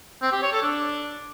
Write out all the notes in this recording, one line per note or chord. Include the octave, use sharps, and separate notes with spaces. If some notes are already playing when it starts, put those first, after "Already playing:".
C4
G4
C#5
A4
D4